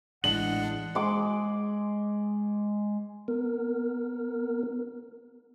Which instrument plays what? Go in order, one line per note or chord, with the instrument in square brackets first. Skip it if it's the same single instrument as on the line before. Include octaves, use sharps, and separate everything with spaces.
[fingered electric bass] A1 E3 [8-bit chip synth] G#3 D4 [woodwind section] F#5 [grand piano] F#7
[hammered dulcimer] G#3 D6
[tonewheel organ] B3 A#4